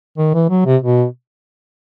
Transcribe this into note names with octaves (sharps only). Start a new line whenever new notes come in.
D#3
E3
F#3
C3
B2